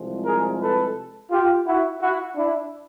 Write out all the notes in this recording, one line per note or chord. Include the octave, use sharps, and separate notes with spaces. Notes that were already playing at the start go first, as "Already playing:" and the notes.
Already playing: C2 C3 F3 G#3
G#4 A#4
A4 B4
F4 G4
E4 F#4
E4 F#4
D4 E4